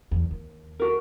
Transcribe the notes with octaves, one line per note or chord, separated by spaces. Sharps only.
E2
D#2
F#4 A#4